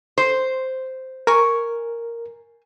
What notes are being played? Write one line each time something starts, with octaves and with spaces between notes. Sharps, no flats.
C5 C6
A#4 G#5 C#6